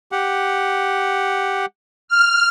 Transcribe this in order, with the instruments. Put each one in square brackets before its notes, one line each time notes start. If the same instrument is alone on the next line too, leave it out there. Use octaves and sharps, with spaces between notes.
[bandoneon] G4 F#5
[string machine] F6